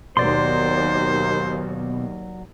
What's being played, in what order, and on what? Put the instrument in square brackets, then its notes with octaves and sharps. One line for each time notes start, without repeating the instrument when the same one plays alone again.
[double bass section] D#2 [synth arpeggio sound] B2 [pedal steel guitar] F#3 D5 C6 [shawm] C5